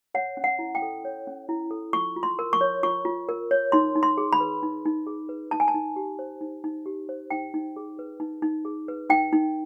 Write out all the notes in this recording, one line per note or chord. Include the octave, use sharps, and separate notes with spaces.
C#5 F#5
C#4
F#5
E4
G5
A4
C#5
C#4
E4
A4
F4 C#6
F4
C6
A#4
C#6
C#5
F4 C#6
F4
A#4
C#5
D#4 C6
D#4
C6
G#4
B5
B4
D#4
D#4
G#4
B4
D#4 A5
G#5
A5
D#4
G4
C5
D#4
D#4
G4
C5
D#4 G5
D#4
G#4
B4
D#4
D#4
G#4
B4
D#4 G5
D#4